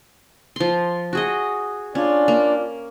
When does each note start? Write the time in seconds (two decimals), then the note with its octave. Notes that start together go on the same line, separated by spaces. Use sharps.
0.56 F3 C6
1.13 F#4 G#4 D#5
1.95 C#4 D4 F4 D5
2.28 A#3